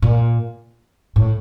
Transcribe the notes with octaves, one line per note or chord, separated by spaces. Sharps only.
A#2
A2